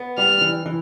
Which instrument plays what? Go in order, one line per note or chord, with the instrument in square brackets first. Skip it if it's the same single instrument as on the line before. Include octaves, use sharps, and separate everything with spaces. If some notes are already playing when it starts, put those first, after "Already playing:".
Already playing: [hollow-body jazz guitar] B3
[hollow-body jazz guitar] G3 [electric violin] F6
[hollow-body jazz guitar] E3
E3